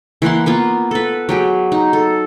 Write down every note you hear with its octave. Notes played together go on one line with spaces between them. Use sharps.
E3 A#3 F#5 C6
A#3 B3 F4
A4 B4
F#3 G4 G#4
D#4
A4